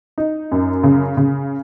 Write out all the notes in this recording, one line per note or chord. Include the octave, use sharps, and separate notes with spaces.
D#4
F#2
C#3
C#3